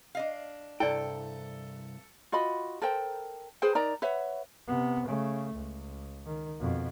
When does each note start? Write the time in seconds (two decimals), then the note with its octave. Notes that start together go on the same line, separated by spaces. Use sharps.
0.15 D4 D#5 F5
0.80 C2 G2 E4 A4 D5 G5
2.32 F4 F#4 D#5 B5
2.82 A4 A#4 C5 G5
3.62 G#4 B4 C5 G5
3.75 D#4 A#4 D5 A#5
4.02 B4 C#5 E5 F#5
4.68 C3 B3
5.05 C#3 A3
5.54 C#2
6.26 D#3
6.59 F2 B2